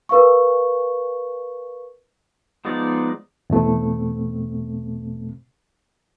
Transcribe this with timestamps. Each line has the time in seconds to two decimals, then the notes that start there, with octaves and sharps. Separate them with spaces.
0.09 A#4 B4 F5 C#6
2.65 F3 G#3 B3 D#4 D5
3.50 E2 B2 A3 C4